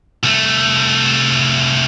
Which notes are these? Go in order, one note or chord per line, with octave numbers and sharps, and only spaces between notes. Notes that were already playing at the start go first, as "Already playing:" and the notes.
C2 A3